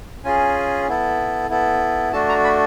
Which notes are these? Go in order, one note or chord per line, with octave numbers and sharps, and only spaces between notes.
C#4 F4 G#4 G#5
B3 E4 A4
B3 E4 A4
A3 D4 F#4 A4 A5
A#5
B5